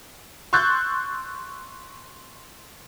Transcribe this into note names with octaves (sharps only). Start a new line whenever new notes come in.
C6 C#6 E6 F#6 G6 A6